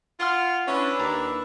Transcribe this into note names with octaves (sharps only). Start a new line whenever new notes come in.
F4 F#5 C6 F6
C#4 D4 E4 B4 E5
D#2 A#5